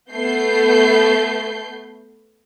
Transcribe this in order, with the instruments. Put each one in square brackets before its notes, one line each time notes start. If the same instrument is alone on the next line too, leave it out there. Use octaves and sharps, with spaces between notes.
[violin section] A3 B3 G6 C7